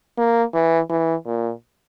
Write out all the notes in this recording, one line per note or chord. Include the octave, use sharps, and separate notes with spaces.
A#3
E3
E3
A#2